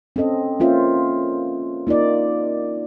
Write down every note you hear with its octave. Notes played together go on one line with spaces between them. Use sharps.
C4 C#4 A4 D#5
A#3 C#4 F4 C5 E5
A#3 D#4 F4 D5